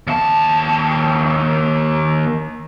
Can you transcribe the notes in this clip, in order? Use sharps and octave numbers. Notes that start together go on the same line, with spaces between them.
D#2 A5